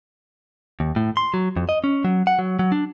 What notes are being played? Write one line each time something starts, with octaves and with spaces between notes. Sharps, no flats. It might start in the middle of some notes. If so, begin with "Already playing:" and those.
D#2
A2
C6
F#3
F2
D#5
C#4
F#3
F#5
F#3
F#3
D4